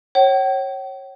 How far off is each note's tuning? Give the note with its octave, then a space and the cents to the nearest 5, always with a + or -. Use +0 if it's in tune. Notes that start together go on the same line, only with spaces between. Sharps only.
C#5 -25 G5 -45